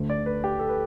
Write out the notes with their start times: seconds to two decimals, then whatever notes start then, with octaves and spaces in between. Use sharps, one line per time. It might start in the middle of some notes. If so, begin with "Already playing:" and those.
Already playing: D2 D3 A3
0.10 D5
0.26 B4
0.44 G4
0.59 A4
0.69 B4